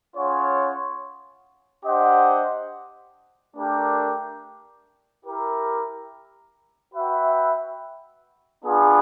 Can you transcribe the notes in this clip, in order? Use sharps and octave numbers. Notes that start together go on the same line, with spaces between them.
C#4 F4 G#4 C#5 F#5
D4 G4 C5 D#5 F#5
A3 D4 G4 A#4
E4 G4 A#4
F#4 B4 E5 G5
B3 D4 F4 G#4 B4